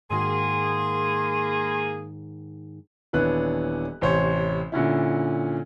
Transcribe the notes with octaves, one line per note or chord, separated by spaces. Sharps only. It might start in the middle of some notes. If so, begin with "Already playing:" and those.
G#2 D#3 A#3 F#4 G#4 C6
D#1 E3 B3 D4 C#5 F#6
A1 C3 C5 C#5
A#2 D3 C#4 E4